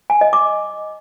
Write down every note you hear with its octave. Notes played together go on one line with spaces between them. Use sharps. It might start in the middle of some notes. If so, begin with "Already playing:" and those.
G#5
D#5
D6